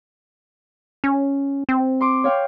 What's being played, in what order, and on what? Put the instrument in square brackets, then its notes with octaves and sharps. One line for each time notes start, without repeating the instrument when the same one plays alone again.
[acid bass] C#4
C4
[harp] C6 D6
C#5 F5 G5